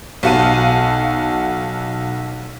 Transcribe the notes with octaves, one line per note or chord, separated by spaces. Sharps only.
B1 F#4 F5 A5 D#7